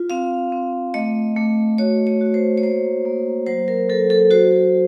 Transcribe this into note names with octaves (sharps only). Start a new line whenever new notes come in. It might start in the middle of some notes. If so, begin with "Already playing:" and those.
Already playing: F4
C4 F5
C4
A3 D#5
A3
F#4 C#5
C#5
F#4
C5
C#5
A#3 C5
A#3
F#3 C5
A#4
F#3 A4
A4
F#4 C5